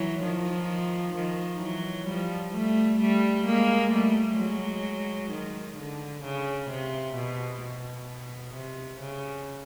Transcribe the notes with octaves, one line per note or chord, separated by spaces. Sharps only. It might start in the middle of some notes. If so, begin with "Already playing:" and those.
Already playing: E3 F#3
D#3 F3
D#3 F3
E3 F#3
F3 G3
G3 A3
G3 A3
G#3 A#3
G3 A3
F#3 G#3
D#3
D3
C#3
C3
B2
B2
C3
C#3